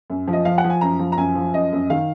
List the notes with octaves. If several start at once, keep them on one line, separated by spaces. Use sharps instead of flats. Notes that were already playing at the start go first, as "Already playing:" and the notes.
F#2
F3
D#5
F3 F5
F#5
F3
G#5
F#2 A#5
F3
A#5
F#2 G#5
F3
F#2 D#5
F#2
D#3 F5